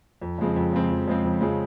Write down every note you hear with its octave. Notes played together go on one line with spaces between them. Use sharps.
F2
C#3 F3 G#3 C4
F2
C#3 F3 G#3 C4
F2
C#3 F3 G#3 C4
F2
C#3 F3 G#3 C4